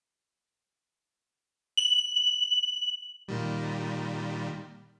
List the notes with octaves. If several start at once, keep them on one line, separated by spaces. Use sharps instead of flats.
F#7
A#2 D#3 G3